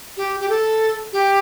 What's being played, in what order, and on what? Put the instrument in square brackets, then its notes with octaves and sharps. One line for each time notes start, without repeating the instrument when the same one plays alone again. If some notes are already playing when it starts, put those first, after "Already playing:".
[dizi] G4
G4
A4
G4